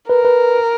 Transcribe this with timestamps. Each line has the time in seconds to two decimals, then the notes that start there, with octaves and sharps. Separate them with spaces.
0.09 A#4 B4
0.25 B4